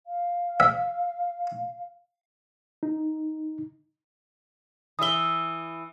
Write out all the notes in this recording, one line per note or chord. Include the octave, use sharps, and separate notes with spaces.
F5
E5
D#4
E3 E5 D#6 G7